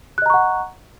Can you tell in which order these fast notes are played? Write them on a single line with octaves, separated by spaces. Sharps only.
F#6 D#5 A#5 C#6 F#5